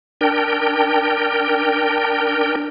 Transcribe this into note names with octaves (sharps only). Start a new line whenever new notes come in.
D4 A#4 G5